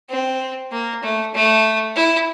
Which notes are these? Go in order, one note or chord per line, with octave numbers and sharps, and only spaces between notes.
C4
A#3
A3
A3
E4